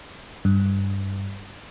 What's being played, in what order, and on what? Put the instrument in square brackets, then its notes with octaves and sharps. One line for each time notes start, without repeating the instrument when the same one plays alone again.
[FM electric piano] G2